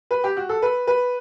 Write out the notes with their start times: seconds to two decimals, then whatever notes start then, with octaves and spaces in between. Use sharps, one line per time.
0.11 B4
0.24 G4
0.37 F#4
0.49 A4
0.62 B4
0.87 B4